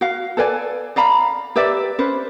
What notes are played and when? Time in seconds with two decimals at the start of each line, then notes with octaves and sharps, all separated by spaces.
0.01 F#4 F5
0.37 A4 B4 D5 G#5
0.96 D5 F5 A#5 B5
1.56 G4 B4 D5 E5
1.99 C#4 B4 C5